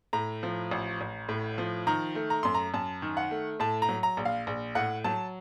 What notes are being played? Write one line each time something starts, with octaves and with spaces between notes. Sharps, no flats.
A2 A#5
F3
A1
A1
A2
F3
D#3 A#5
A3
A#5
F#2 C6
A#5
F#2 A5
D#3
F#5
A3
A2 A5
A#5
F#3
A#5
A#1
F5
A#1
A2 F#5
F#3 A5